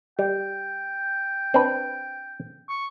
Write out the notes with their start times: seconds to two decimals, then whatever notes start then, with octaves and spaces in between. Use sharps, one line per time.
0.19 G3 G5
1.54 C4 D4 B4
2.69 C#6